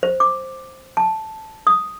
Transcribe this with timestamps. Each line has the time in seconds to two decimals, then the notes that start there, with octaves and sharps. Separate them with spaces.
0.03 C5
0.20 D6
0.97 A5
1.67 D#6